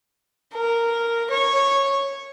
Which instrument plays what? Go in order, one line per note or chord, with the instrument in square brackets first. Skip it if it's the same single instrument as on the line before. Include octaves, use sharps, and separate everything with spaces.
[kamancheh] A#4
C#5